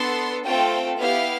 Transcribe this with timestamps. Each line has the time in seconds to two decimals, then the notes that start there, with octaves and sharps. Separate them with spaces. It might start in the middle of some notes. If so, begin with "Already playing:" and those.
Already playing: B3 D4 A4 C6
0.45 A3 C4 F4 A4 G5
0.97 B3 E4 G4 F5